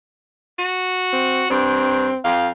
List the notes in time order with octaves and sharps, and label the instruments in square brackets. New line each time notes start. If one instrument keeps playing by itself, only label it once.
[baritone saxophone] F#4
[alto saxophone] C4
[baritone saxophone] G2 [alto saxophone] C4
[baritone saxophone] F2 [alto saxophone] F5